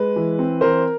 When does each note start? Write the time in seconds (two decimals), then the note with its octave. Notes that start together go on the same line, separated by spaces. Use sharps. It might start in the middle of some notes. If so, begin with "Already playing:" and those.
Already playing: G#3 B4
0.16 E3
0.39 C4
0.61 E3 A#4 C5